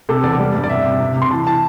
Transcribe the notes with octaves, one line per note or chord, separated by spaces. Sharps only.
C3 A4
E2 D5
G3 D5
G2
D5
C3 E5
C3
C3
C3
C6
E3 A5
E3 A5